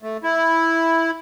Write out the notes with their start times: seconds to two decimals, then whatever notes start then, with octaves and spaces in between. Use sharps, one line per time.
0.03 A3
0.23 E4